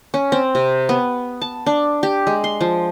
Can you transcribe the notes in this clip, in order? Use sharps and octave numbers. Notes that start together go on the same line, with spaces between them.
C#4
C4
C3
B3
A5
D4
G4
G#3
C6
F3